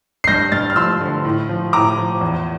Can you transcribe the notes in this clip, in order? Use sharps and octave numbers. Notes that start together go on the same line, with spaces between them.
C7
G2 G6 A#6
G2 F6 A6
F6
F3 C6 E6
D3
A2
F3
A2 A#5 D6
F3
E2